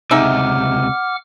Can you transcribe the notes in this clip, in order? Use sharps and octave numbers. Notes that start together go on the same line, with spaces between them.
C#2 C3 D#4 G#4 E5 F#5 D6 F6